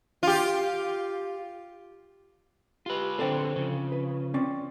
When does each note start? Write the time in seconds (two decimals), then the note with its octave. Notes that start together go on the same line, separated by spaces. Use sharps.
0.23 F4 G4
2.86 F4 G4 B4
3.19 D3 C4 A4 C5 D5 G5
3.56 C#3 F3
3.92 B4
4.34 C4 C#4 D5